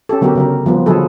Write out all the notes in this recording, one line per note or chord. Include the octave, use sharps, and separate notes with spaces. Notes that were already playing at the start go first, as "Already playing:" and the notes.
C#4 G4 A4
D3 F#3 B3 F#4 G4 A#4
C#3 F#3 A#4
F3 G3 B3
D3 F3 F#3 G#4 A4 B4